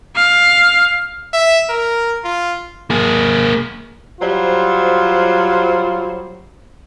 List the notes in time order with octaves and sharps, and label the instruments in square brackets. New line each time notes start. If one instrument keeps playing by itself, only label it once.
[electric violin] F5
[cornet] E5
A#4
F4
[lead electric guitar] A#3 G#4
[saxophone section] F#3 G3 C5 [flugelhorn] F4